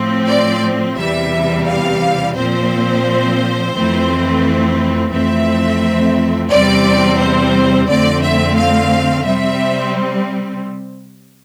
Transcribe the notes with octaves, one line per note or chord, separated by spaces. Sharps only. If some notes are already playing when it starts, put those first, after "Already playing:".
Already playing: A2 F3 C4
D5
E2 C3 E3 G3 E5
F5
A#2 F3 C4 C5
F2 E3 A3 C4
F2 E3 A3 C4 E5
E2 C3 G3 C4 D5
C5
F2 D3 A3 C4 D5
E5
F5
C3 G3 C4 E5